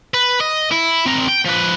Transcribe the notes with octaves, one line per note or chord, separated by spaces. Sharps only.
B4
D#5
E4
C4 A#4
G5
F3 B4